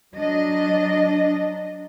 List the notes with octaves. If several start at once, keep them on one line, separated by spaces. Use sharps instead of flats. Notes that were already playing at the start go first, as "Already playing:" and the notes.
F#3 D4 D#5